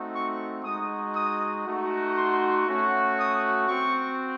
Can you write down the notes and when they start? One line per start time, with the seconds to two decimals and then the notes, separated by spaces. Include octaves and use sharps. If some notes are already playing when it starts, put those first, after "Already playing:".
Already playing: A3 C4 D#4 F#4
0.14 C#6
0.64 G#3 D#4 F#4 D#6
1.14 D#6
1.66 A3 D#4 F#4
2.16 C6
2.67 A3 C#4 F#4
3.18 D#6
3.68 C4 F#4 C#6